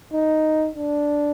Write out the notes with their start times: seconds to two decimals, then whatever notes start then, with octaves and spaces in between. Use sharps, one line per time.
0.13 D#4
0.75 D4